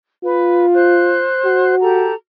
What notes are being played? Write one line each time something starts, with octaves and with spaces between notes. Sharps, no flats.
F4 B4
C5 F#6
F#4
G4 A4 A#5